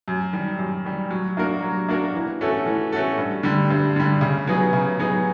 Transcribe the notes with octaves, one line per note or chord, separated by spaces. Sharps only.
F#2
D#3 G3
F#2
D#3 G3
F#3
A#3 D4 F#4 A#4
F#3
A#3 D4 F#4 A#4
E3
A3 C#4 F#4 A4
E3
A3 C#4 F#4 A4
G2
D3 G3
G2
D3 G3
C#3
F#3 B3 D#4 G#4
C#3
F#3 B3 D#4 G#4